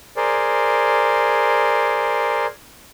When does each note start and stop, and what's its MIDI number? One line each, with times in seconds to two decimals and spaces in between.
0.16 2.46 68
0.16 2.46 70
0.16 2.46 72
0.16 2.46 74